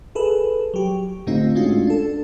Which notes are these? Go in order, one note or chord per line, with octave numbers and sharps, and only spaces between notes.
G#4 A4 B4
F#3 G4
A2 D3 A3 C4 D#4 F4
G#3 A3 C#4 D4 F4 F#4
D4 A4